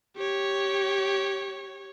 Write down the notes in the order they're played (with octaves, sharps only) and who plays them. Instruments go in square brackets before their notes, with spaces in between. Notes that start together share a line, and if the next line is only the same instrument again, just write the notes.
[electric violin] G4 C#5